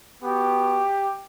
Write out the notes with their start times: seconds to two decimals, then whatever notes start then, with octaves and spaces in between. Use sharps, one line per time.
0.23 B3 F#4 G4